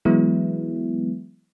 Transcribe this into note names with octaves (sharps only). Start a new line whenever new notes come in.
E3 F#3 G#3 B3 E4